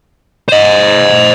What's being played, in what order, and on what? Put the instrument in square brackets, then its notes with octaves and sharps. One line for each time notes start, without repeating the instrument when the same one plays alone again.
[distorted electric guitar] C5 D#5